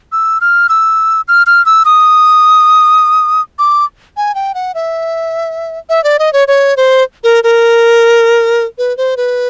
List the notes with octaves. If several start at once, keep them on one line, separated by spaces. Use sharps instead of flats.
E6
F6
E6
F6
F6
E6
D#6
D6
G#5
G5
F#5
E5
E5
D5
D#5
C#5
C#5
C5
A#4
A#4
B4
C5
B4